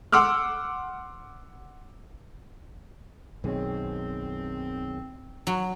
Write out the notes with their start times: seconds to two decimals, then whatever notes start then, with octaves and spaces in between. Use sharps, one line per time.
0.12 F#5 C6 D6 E6 F6
3.44 B1 F#2 B2 D#3 C4 G#4 C#5
5.47 F#3